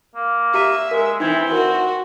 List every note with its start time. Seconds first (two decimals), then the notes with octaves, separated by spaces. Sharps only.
0.15 A#3
0.54 G4 E5 A#5 D#7
0.91 G#3 A#4
1.20 E3 C4 D#4 G#6
1.52 F#4 A#4